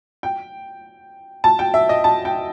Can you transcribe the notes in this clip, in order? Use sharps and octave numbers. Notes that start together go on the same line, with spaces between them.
G5
A5
G5
E5
D#5
A5
G5